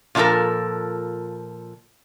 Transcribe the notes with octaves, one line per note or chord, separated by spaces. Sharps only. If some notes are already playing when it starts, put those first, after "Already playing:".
A#2 F3 C#4 A4 A#4